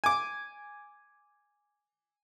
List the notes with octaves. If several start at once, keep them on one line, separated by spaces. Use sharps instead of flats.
G#5 D6